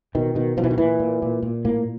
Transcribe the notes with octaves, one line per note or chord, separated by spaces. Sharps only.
B2 D#3
B2 D#3
B2 F3
E3
D#3
A#2 E3
A#2
A#2
A#2
A2 A#3